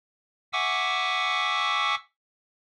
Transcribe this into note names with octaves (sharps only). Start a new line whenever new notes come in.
E5 F#5 G#5 C#6 D6 E6